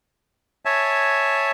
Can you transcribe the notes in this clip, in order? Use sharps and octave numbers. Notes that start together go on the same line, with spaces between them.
C#5 E5 G#5 A5